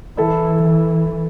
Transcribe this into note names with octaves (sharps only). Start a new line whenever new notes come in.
E3 E4 A4
E3